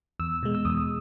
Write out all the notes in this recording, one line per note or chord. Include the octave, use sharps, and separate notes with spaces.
E2 E6
B2 G#3
E6
E2 D#6